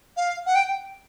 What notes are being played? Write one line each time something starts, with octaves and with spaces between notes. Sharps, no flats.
F5
F#5
G5